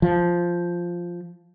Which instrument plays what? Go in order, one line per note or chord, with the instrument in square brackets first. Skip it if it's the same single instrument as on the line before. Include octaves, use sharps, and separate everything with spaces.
[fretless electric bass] F3